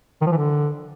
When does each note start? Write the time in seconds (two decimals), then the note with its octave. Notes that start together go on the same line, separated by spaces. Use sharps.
0.22 D#3
0.27 F3
0.32 E3
0.37 D3